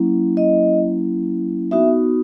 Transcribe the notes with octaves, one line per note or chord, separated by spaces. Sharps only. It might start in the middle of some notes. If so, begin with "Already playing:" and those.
Already playing: F#3 A#3 C#4 E4
D#5
B3 D#4 F#4 E5